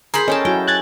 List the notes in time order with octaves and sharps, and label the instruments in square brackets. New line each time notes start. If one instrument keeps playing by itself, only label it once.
[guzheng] G#4 C5 B5 [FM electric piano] A#4
[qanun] C#4 G5 A5 [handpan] A4 D#5
[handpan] F#3 E4 F#4 [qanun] G5
[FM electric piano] F#6 G#6 A6